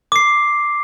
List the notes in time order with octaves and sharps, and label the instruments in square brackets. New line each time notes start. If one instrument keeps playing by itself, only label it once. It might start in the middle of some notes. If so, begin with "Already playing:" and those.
[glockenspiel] D6 C7